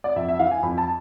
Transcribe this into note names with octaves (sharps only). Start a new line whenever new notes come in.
D5
F2 E5
E5
E3 F5
G#5
F2 B5
A5